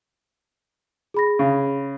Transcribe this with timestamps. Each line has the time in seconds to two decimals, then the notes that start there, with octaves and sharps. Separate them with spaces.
1.14 G#4 B5 A#6
1.39 C#3